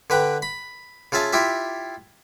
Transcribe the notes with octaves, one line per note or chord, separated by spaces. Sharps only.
D3 B4 G5
B5
C#3 F4 G#4 E5 A5
E4 F4 G4 E5